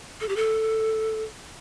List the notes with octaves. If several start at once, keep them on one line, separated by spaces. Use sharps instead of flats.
A4
G4
A4